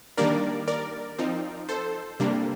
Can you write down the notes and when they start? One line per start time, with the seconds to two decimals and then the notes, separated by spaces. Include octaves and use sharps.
0.17 D#3 G3 A#3 D4 A#4 D5
0.68 A#4 D5
1.19 F3 C4 D#4
1.69 A4 C5
2.20 C3 G3 A#3 D4